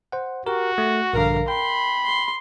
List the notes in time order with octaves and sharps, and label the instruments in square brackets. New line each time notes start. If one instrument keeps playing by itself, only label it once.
[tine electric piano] C5 F#5
[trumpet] F#4 [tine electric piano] G4 A#4
[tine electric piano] A3
[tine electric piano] A#1 G2 D3 [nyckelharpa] A#4 F5
[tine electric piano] G5 [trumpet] B5 [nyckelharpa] C6
[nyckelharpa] C6